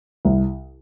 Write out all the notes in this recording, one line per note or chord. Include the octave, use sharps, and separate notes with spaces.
C2